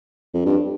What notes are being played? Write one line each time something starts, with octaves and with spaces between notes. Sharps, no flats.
F2
G2